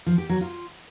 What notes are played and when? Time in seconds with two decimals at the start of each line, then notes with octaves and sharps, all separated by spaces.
0.06 F3
0.18 G4
0.29 F#3
0.41 F4